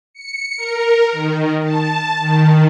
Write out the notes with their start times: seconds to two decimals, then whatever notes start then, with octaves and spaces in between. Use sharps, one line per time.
0.13 C#7
0.57 A#4
1.12 D#3
1.63 A5
2.20 D#3